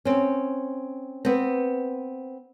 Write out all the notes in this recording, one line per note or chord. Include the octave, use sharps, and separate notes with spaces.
C4 C#4
B3 C4